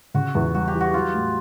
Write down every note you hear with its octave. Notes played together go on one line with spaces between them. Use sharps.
C#3 F#4
E2
G3 F#4
G4
E3
F#4
F#3 F4
A2